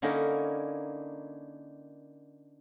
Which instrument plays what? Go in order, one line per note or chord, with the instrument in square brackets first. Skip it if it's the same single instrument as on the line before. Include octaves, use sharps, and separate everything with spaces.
[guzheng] D3 A#3 C#4 D#4 E4 A#4